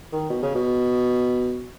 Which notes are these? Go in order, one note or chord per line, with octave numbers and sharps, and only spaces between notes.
D#3
B2
C#3
B2